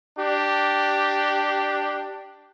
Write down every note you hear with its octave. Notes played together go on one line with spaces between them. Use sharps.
D4 G4